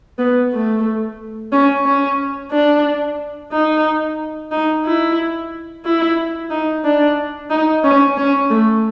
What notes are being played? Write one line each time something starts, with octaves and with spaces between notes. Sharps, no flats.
B3
A3
C#4
C#4
D4
D#4
D#4
E4
E4
D#4
D4
D#4
C#4
C#4
A3